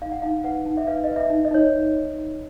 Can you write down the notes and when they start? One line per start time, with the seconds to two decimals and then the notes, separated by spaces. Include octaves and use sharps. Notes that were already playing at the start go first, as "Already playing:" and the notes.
0.02 D#4 F5
0.12 F#5
0.22 D#4 F5
0.44 B4 F#5
0.66 D#4
0.77 E5
0.87 B4 F5
1.04 B4 D#5
1.16 E5
1.30 D#4
1.45 D#5
1.51 D#4 C#5